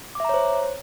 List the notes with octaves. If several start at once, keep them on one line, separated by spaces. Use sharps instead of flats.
C5 C#5 E5 A#5 D6